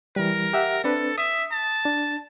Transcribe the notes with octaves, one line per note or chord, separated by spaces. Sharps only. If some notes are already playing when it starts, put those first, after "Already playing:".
E3 G3 A#4
G4 E5 F#5
C4 D4 A4 B4
E5 D#6
A5
D4